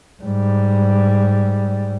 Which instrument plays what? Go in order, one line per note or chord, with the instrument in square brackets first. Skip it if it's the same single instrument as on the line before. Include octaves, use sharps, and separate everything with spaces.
[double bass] G#2 G3